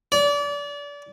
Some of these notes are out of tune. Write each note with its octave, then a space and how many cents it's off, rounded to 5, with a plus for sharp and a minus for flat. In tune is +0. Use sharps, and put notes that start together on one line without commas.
D5 -30